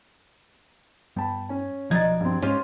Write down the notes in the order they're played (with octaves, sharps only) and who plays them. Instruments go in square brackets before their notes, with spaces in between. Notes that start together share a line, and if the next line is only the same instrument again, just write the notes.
[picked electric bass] G2 G3 B3 [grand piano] G5 A5 B5
[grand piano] C#4 G#5
[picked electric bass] B1 [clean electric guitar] F3 F#4 D5 [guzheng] D#4 [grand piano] G#6 A6
[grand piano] G2 C4
[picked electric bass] G#2 [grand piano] C#4 [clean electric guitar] D4 G4 C5 [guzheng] F4